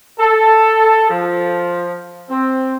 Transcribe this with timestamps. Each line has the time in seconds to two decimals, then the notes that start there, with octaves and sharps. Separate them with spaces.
0.19 A4
1.10 F3
2.30 C4